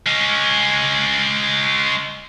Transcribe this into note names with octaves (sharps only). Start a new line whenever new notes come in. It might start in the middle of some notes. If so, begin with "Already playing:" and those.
G#3 C#4